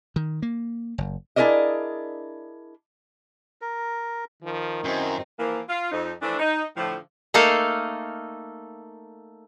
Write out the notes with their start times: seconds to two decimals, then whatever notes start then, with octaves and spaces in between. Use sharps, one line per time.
0.16 D#3
0.42 A#3
0.98 F#1
1.36 D4 E4 G#4 A#4 D5 D#5
3.61 A#4
4.43 D#3 F3
4.84 F#2 C4 D#4 E4
5.39 E3 F3 A#3
5.69 F4
5.91 F2 D#4
6.22 E3 F3 A3 D4
6.39 D#4
6.77 A2 D3 F3
7.34 A3 A#3 D#4 A4 F5